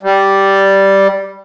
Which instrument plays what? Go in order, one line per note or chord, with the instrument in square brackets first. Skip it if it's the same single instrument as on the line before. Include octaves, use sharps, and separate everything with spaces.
[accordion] G3